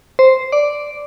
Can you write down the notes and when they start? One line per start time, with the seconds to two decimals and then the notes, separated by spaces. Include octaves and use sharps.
0.19 C5
0.52 D5